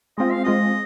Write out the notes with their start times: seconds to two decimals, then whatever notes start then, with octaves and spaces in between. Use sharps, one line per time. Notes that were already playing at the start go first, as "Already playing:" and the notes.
0.18 G#3 C4 F4 D#5
0.31 F5
0.44 G#3 C4 F4 D#5